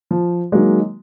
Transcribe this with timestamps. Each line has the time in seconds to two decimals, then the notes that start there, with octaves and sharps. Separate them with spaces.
0.11 F3
0.52 D#3 F#3 G#3 A#3